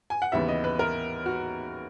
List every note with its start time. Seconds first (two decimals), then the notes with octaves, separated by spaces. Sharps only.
0.10 G#5
0.22 F#5
0.32 D#2 C#3 E3 B3 E5
0.48 D#5
0.64 B4
0.79 A#4
1.26 F#4